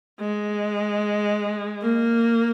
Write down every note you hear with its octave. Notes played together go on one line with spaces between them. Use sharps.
G#3
A#3